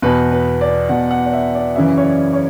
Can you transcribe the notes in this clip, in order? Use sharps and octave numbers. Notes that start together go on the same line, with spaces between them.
E2 B2 B4
B4
D5
E2 B2 F#5
F#5
D5
E5
D5
F#2 C#3 E3 E5
C#5
D5
C#5